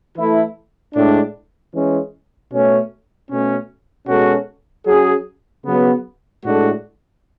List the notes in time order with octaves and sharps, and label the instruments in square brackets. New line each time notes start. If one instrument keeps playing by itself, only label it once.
[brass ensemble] E3 A3 E4 A4
A2 G#3 D4
E3 G#3 C#4
B2 A3 C#4
B2 A3 C#4
B2 G#3 C#4 F#4 A4
F#3 C#4 G#4
C#3 F#3 B3
A2 G#3 D4 F#4 A4